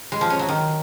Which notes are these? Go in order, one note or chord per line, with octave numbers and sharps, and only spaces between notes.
G#3
F3
C#4
F#3
D#3